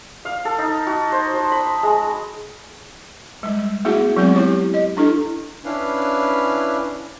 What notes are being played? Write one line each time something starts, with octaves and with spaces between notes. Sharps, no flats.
F5
A4
D#4
F#4
C5
C5
B5
G#3
G3 G#3
A3 B3 E4 F#4 G#4 F#5
F#3 G#3 B3 C4
E4 G4 C#5
D#5
D4 E4 A4
C#4 D4 E4 B4 F5